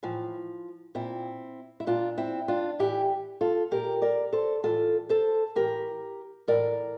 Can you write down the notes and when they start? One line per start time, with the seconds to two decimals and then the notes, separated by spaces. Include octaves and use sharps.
0.03 A2 E3 F3
0.95 A#2 C4 E4
1.80 E4
1.87 A#2 D4 F4
2.18 C4 E4
2.48 D4 F4
2.79 A2 E3 E4 G4
3.41 F4 A4
3.71 A#2 G4 A#4
4.02 A#4 D5
4.33 A4 C5
4.63 A2 E3 F4 A4
5.09 A4 C5
5.55 A2 E3 G4 A#4
6.48 A2 E3 A#4 D5